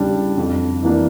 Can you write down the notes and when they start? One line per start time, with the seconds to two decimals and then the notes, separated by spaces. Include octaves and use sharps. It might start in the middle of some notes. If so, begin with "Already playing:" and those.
Already playing: E2 C#3 G3 D4
0.38 F2
0.83 E3 A#3 D4